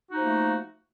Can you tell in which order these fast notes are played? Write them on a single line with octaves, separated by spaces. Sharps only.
F#4 D#4 F3 A#3 A3